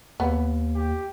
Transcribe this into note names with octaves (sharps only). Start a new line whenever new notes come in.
D#2 B3
G4